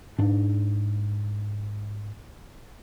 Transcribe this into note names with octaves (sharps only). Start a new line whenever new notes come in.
G#2 D4